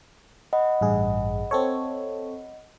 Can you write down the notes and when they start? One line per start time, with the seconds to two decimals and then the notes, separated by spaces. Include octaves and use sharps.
0.53 D#5 F#5 B5
0.81 A1 G2 G#4
1.51 C4 A4 C#5